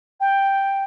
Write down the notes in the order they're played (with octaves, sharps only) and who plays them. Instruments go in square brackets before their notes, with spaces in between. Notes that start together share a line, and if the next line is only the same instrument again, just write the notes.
[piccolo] G5